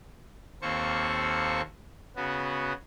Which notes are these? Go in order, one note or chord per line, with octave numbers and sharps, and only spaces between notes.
D#2 A#3 C4 A4 C5 C#6
C#3 B3 F#4